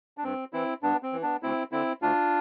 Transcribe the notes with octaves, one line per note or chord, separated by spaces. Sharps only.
D4
G2 C4
E3 C4 E4
G2 B3 D4
C4
E3
B3 D4
D2 C4 E4
D3 C4 E4
D2 D4 F4